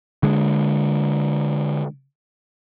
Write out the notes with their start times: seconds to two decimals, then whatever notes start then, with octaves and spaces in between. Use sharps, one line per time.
0.23 D3 G#3